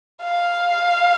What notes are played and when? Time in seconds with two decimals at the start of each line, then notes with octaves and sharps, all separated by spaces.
0.23 F5